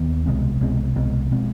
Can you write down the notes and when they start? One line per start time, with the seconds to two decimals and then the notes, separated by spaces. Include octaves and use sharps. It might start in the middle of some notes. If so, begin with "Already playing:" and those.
Already playing: D#2 D#3 B3
0.26 C2 B2 G#3 C4
0.61 C2 B2 G#3 C4
0.96 C2 B2 G#3 C4
1.31 B2 G#3 C4